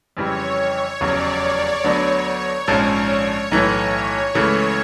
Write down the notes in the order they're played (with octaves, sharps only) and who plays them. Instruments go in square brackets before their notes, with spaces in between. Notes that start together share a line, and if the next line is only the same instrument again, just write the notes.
[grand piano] F2 C#3 E3 G3 C4 [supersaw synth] C#5
[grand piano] F1 E2 C#3 F#3 [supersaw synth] D5
[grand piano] D2 D3 F#3 B3 D4 [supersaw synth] C#5
[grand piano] A#1 G#2 F3 G#3 C#4
B1 A2 E3 A3
[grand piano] C#2 C#3 E3 A3 [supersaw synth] C#5